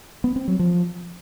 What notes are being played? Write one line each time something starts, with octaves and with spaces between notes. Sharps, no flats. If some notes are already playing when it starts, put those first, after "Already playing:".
B3
C4
F#3
F3